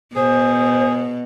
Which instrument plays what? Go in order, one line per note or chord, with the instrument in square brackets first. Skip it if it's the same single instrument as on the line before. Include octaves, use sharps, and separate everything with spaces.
[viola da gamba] B2 [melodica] G#4 [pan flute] C5